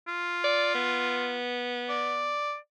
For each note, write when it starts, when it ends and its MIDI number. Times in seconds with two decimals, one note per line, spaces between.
0.08 1.38 65
0.44 0.74 74
0.74 2.39 59
1.89 2.56 74